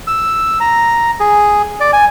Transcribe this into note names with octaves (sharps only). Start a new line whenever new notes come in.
E6
A#5
G#4
D5
G#5